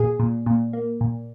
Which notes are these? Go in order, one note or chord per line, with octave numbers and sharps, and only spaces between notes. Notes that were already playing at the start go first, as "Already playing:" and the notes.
Already playing: A#2 G#4
A#2
A#2
A#3
A#2